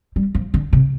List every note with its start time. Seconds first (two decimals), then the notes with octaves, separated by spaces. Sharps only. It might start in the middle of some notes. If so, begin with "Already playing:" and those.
0.16 G3
0.35 F3
0.54 D3
0.73 C3